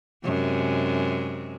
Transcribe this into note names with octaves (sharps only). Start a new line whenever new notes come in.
F#2 C3 G#3